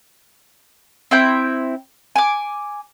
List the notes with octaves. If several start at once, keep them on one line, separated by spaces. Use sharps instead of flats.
C4 E4 G5
G#5 D6